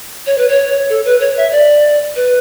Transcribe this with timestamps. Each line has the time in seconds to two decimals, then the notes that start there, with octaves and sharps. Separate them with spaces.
0.26 C#5
0.38 B4
0.48 C#5
0.90 A4
1.05 B4
1.20 C#5
1.37 E5
1.52 D5
2.16 B4